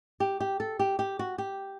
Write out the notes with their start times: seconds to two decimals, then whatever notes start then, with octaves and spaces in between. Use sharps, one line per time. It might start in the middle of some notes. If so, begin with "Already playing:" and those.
0.20 G4
0.40 G4
0.60 A4
0.79 G4
0.99 G4
1.19 F#4
1.38 G4